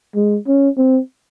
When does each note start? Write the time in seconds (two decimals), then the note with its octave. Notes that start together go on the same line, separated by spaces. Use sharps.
0.15 G#3
0.47 C#4
0.78 C4